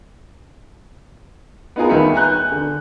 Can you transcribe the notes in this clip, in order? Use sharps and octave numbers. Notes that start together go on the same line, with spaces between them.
B3 D#4 F4 G#4 A#4
D#1 D#3 B4 E5 B5 C#7
G#5 A#5 F#6 G6
D3